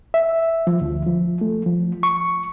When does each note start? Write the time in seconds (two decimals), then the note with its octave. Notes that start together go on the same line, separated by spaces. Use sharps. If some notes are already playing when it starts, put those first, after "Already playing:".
0.14 E5
0.67 F3
0.81 D2
1.06 F3
1.41 A3
1.66 F3
2.03 C#6